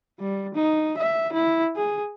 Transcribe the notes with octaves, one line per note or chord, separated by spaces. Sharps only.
G3
D#4
E5
E4
G#4